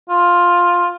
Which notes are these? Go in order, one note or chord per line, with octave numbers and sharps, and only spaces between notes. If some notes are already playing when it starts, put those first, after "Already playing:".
F4